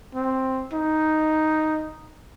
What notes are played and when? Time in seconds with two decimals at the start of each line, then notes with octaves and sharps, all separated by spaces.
0.15 C4
0.73 D#4